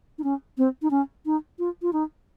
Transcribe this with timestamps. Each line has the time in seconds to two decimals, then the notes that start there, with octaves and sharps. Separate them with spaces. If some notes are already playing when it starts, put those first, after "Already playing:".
0.18 D#4
0.24 C#4
0.58 C4
0.82 D#4
0.90 C#4
1.26 D#4
1.59 F4
1.82 F4
1.93 D#4